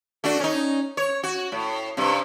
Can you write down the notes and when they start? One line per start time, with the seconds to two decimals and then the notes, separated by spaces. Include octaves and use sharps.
0.24 A3 D4 F#4
0.40 C#4 D#4
0.97 C#5
1.23 F#4
1.52 A2
1.97 G2 C3